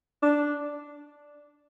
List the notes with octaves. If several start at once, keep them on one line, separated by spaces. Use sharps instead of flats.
D4